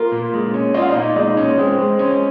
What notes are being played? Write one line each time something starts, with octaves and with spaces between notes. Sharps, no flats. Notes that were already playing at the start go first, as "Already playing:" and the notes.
Already playing: A#3 F4 A#4
A#2
G#3
C#4
F4 D#5
F5
D#4 D#5
A#2
G#3 D#4 D#5
C#4
C#5
G#3 C4 C5
G#3
C#4